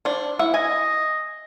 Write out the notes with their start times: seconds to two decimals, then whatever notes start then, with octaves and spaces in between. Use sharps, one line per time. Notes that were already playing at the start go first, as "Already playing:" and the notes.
0.05 D4 C5
0.39 E4 E5 F#5
0.54 D#5 G#5